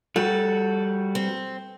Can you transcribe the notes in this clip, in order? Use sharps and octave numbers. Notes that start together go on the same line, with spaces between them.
G3 F#4 A4
C4